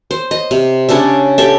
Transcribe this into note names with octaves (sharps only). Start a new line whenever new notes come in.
C5
D#5
C3
C#3 C#4 D4 E5
G4 A4 E5